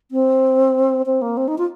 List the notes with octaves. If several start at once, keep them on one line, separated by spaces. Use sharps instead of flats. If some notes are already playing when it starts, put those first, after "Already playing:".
C4
C4
A#3
C4
D#4
F4